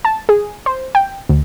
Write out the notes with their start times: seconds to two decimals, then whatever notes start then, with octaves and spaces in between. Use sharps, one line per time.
0.05 A5
0.29 G#4
0.66 C5
0.95 G5
1.29 D2